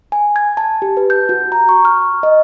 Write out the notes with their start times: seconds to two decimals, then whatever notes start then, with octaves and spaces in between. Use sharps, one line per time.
0.12 G#5
0.36 G#6
0.57 A5
0.82 G4
0.97 B4
1.10 G6
1.29 F#4
1.52 A#5
1.69 C#6
1.85 F6
2.23 D#5